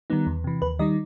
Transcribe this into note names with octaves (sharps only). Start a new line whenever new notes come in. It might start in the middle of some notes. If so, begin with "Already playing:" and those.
D#3 G3 B3 D#4
E2
C3 E3
D#2 B4
D#3 G3 D#4 D#5